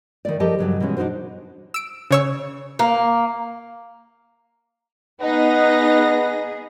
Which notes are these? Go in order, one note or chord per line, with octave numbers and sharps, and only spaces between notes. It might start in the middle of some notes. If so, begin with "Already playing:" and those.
D#3 A3 D5
F3 G4 A4 A#4 D#5 A5
G2 C#3 F#3
B2 E3 G#3 C#4
D4 D#4 F4 F#4 C5
E6 D7
C#3 C#5 E6
A#3
B3 D#4 G#4 B4 D#5 F#5 A#6